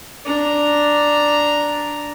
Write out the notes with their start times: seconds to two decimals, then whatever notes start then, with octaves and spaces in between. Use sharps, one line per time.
0.25 D4 A#5